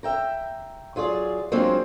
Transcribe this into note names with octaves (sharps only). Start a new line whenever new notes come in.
E5 G5 A#5
F#3 F4 G#4 D5
F#3 G#3 A#3 C4 D4 F4